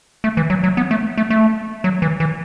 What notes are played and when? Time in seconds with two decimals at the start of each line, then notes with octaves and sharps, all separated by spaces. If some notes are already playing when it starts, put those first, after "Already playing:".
0.24 A3
0.37 E3
0.50 F#3
0.64 F#3
0.77 B3
0.91 A3
1.18 A3
1.30 A3
1.84 F#3
2.02 E3
2.20 E3